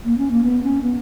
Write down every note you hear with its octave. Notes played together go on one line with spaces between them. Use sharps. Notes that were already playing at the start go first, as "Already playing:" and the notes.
A#3
C#4
A#3
B3
C#4
B3